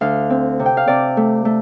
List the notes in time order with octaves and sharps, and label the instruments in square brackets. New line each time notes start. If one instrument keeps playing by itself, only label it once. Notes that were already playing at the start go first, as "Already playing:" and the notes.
[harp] D2 F5
C4
C3
G5
F5
C3 D5
A3
A3